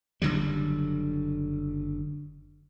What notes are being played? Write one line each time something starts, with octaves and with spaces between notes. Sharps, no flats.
F#1 D3 F#3 G3